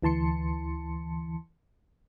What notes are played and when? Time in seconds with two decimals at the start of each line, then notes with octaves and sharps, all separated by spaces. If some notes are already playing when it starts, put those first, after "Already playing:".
0.03 D2 E3 A5 C6 C#7